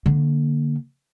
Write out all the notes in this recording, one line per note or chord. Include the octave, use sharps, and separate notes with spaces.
D3 A#3